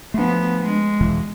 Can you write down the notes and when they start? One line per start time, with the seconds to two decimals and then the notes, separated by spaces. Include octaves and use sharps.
0.14 F3 A3 B3 D4
0.62 G#3
1.01 E2 B2 E3